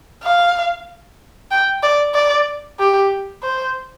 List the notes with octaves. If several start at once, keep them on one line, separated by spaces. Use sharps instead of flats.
F5
G5
D5
D5
G4
C5